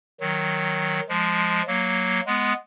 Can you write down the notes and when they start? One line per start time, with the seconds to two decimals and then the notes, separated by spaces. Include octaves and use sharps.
0.20 D#3 F#3
1.09 F3 G#3
1.67 F#3 A#3
2.26 G#3 B3